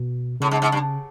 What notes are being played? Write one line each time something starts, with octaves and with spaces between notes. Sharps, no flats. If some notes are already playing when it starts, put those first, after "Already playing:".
Already playing: B2
A2 C#3
G#2
G#2
G2